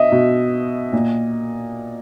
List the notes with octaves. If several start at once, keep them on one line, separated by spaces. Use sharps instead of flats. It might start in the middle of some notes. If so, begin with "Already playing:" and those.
Already playing: B2 D#5 E5
B2
A#2